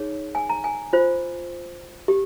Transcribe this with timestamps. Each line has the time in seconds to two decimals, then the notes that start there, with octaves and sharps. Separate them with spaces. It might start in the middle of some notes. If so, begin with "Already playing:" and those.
Already playing: D#4 G#4 C#5
0.35 G#5
0.49 A#5
0.64 G#5
0.93 F4 C5
2.08 G4